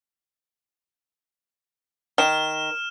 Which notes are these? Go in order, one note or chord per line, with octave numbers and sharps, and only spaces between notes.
D#3 F6 E7